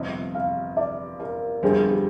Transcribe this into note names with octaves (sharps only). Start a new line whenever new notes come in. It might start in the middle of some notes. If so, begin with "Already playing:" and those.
Already playing: G1 F2 C3 D#5
F5
D5
A#4
G1 F2 D3 G3 C4 G#4
G4